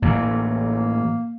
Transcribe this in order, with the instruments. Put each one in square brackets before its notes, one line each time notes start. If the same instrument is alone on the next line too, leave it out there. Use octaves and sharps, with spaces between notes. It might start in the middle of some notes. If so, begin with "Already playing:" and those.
[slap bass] A2 E3 F#3 [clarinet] A#3